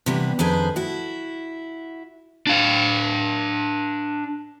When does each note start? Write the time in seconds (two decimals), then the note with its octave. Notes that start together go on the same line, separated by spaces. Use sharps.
0.06 C3 E3 G3 B3 D4
0.39 F2 D#3 D4 G#4 B4 C5
0.76 E4 F#4
2.47 D4 F5